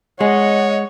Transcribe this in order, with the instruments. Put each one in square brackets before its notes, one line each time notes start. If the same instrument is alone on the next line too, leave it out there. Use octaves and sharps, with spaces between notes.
[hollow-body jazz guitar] G#3 [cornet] C#5 [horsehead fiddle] D#5 F#5